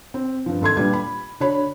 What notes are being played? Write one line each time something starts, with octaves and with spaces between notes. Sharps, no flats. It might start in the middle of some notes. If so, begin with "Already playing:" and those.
C4
G2 F3
G#1 A4 C6 G#6
A#2 G3 D4 B4 G#6
B5
D3 D4 F#4 C#5 B5